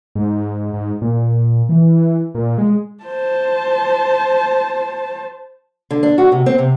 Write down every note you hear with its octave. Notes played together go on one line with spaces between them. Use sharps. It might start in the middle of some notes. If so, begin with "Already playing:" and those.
G#2
G#2
A#2
E3
A#2
G#3
C5 A5
D3
D4
F#4
C3
C4
C3